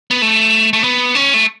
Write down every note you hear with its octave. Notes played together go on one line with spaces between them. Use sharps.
B3
A3
A3
B3
C#4
A3